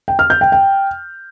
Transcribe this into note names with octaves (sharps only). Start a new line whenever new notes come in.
G5
F6
G6
G5
G5